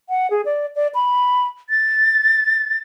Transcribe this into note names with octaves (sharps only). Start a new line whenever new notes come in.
F#5
G#4
D5
D5
B5
A6